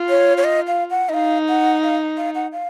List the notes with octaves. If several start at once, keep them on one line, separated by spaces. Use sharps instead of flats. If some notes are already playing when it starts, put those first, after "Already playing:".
Already playing: F4
C#5
C#5
D#5
F5
F#5
D#5
D#4 F5
F#5
F5
F5
F#5
F5